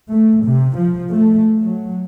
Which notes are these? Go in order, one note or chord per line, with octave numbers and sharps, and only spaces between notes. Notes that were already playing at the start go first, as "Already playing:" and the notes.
A3
C3
F3
A3
F#3